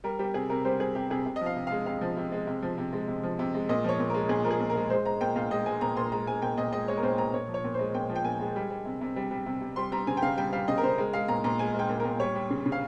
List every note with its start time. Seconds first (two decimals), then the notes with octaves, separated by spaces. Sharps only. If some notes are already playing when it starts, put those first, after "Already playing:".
0.04 G3 A#4
0.19 G3 G4
0.34 C3 G#4
0.50 C3 A#4
0.65 G3 C5
0.80 G3 G#4
0.95 C3 G4
1.10 C3 G#4
1.26 C3
1.36 D#5
1.41 F3 F5
1.56 C3
1.67 G#3 F5
1.86 C3 F5
2.01 F3
2.17 C3
2.32 G#3
2.47 C3
2.62 F3
2.78 C3
2.93 G#3
3.08 C3
3.23 F3
3.39 C3
3.54 G#3
3.69 A#2 D#5
3.84 F3 C#5
4.00 A#2
4.10 G#3 A#4
4.29 A#2 G#4
4.45 F3 A#4
4.50 G#4
4.60 A#2
4.70 A#4
4.75 G#3
4.90 G#3 C5
5.05 G#3 A#5
5.21 A#2 G5
5.36 A#2 F5
5.51 G#3 D#5
5.66 G#3 G#5
5.81 A#2 A#5
5.97 A#2 C6
6.12 G#3 A#5
6.27 G#3 G#5
6.42 A#2 G5
6.58 A#2 D#5
6.72 G#3 D#5
6.88 G#3 C#5
6.97 A#4
7.03 A#2 C5
7.18 A#2 A#5
7.34 A#2 C#5
7.48 F3
7.54 C#5
7.64 A#2
7.74 G#3 C5
7.94 A#2 G5
8.09 F3
8.16 G5
8.24 A#2 G#5
8.40 G#3
8.56 G3
8.70 G3
8.85 C3
9.01 C3
9.16 G3
9.31 G3
9.46 C3
9.61 C3
9.76 G3 C6
9.92 G3 A#5
10.07 C#3 G#5
10.17 G5
10.22 C#3 F5
10.38 G3 G5
10.52 G3 F5
10.68 C#3 D#5
10.78 A#4
10.83 C#3 C5
10.98 G#3 A#4
11.13 G#3 F5
11.28 A#2 A#5
11.44 A#2 A#5
11.59 G#3 G#5
11.74 G#3
11.79 G5
11.90 A#2
12.00 A#4
12.05 A#2
12.20 G3 C#5
12.35 G3
12.50 C#3
12.66 C#3
12.72 F5